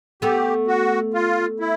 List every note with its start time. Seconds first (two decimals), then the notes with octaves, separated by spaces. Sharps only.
0.22 A3 B3 G4
0.68 F#4
1.14 F4
1.60 E4